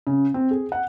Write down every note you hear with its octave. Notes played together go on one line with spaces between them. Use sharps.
C#3
C4
G#4
F#5